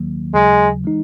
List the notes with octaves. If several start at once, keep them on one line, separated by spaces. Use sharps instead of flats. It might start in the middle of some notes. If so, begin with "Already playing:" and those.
Already playing: D#2 D#3 F#3 A#3
D#2 C#3 F#3 G#3
E3 G#3 D#4